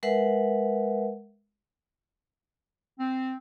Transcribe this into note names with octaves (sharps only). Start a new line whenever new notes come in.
G#3 A#4 B4 E5 F#5
C4